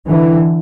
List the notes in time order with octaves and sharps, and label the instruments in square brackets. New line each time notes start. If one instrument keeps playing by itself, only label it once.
[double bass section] D3 E3